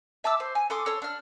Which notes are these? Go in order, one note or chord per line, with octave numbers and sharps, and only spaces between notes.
E5 A5 D6 E6
C5
G#5
A4 C6 D6 D#6
A4 C#5 C6
D4 F6